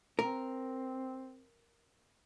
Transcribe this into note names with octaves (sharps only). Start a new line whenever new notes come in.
C4 A#4